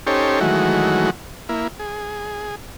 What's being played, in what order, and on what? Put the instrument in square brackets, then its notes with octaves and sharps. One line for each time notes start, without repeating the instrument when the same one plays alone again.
[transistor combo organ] C#4 D#4 G4 A4 C5 C#5
D#3 E3 F#3 G#3 A3 F#4
A#3 E4
G#4